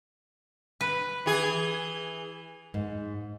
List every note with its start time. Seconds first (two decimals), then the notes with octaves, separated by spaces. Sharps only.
0.81 B4
1.26 E3 G#4
2.74 G#2